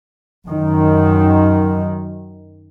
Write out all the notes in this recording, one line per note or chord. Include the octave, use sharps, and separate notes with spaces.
F#2 D#3